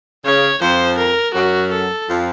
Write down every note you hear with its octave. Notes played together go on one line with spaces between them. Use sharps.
C#3 C#5
F2 F3 C5
A#4
F#2 F#3 F#4
A4
F2 F3